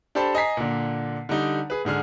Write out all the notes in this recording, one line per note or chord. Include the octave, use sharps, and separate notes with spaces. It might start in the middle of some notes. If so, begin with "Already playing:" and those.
D4 G4 A4 C5 A5 B5
D#5 G#5 A#5 B6 C7
A#2 D3
D3 G3 D#4
G#4 B4
G#2 D3 G#4 F6